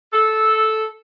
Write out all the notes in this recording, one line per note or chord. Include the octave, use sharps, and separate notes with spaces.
A4